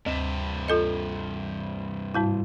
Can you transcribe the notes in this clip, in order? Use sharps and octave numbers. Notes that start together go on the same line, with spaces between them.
D2 G2 C3
F4 A4 D#5
G#2 G3 E4